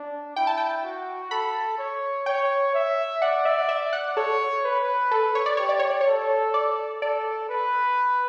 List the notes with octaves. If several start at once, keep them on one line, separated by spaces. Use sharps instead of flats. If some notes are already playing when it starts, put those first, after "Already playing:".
Already playing: D4
E4 G5
A5
G5
F#4
A4 B5
C#5
C#5 G5
E5
D5 F#5
E5
E5
F#5
A4 C#5
B4
A4
C#5
D5
G4 C#5
D5
C#5
D5
C#5
A4
D5
A4 D5
B4